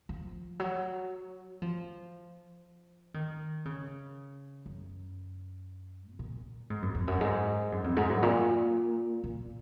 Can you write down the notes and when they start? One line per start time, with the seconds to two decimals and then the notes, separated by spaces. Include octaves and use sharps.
0.09 F3
0.60 F#3
1.62 F3
3.14 D#3
3.65 C#3
4.66 F#2
6.12 C3
6.19 A#2
6.70 G#2
6.82 F#2
6.95 F2
7.07 F#2
7.21 G#2
7.72 F#2
7.84 F2
7.97 G#2
8.09 F#2
8.23 A#2
9.24 A#2